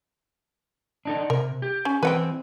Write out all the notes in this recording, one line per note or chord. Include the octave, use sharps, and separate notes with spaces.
D4 D#4 A4
C3 A#4
G4
C#4
E3 C4 B4 F#5 G5